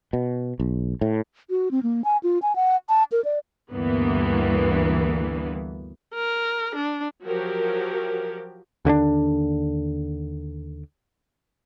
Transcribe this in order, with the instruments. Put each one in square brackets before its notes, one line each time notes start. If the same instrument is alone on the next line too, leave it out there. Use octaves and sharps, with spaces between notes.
[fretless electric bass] B2
B1
A2
[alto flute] F#4
C4
A#3
G#5
F4
G#5
F#5
A5
A#4
D5
[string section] D2 G2 E3 A#3 B3
[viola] A#4
D4
[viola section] F3 F#3 F#4 G4 A#4
[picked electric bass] D#2 D3 C#4 D4